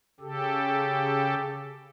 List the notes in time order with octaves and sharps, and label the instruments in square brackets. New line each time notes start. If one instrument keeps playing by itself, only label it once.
[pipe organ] C#3 G4 A4